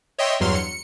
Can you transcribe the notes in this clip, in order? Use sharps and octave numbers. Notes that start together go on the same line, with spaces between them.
C#5 D#5 E5 G5 C6
E2 G2 F#3 C6 F6
C#7